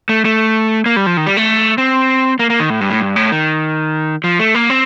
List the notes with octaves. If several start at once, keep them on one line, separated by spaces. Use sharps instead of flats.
A3
A3
A#3
G3
F3
D#3
G3
A3
C4
A#3
A#3
D#3
A2
G2
A2
G2
A2
D#3
F3
A3
A#3
C4